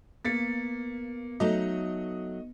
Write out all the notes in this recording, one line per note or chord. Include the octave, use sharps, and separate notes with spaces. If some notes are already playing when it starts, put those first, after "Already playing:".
A#3 B3 A6 B6 C#7
F#3 A3 D#4 D#5